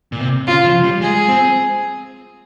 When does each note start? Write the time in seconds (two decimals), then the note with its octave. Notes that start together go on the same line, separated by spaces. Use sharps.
0.12 A#2
0.19 C3
0.47 C#3 F4
0.65 F3
0.83 G3
1.01 G#3 G#4
1.29 C4